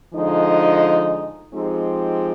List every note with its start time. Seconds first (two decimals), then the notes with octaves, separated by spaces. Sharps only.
0.14 D3 F3 G#3 D#4
1.53 F3 G#3 C4 D#4 G4